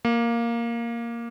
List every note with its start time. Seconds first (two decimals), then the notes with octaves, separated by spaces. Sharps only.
0.05 A#3